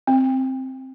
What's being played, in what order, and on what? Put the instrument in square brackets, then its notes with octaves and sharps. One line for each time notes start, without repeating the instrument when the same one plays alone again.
[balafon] C4